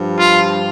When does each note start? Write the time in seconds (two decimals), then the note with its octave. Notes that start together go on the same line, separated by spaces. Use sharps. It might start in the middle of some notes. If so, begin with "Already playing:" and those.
Already playing: G2 F3
0.18 F4